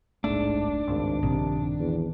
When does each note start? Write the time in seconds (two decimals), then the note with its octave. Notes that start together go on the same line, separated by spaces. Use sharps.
0.24 D1 A#1 G#2 A3 D4
0.88 G#1 C#2 G2
1.23 A#1 G2 C3 D#3
1.79 E2